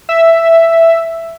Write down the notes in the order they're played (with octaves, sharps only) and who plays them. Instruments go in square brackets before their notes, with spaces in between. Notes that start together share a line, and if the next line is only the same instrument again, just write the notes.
[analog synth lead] E5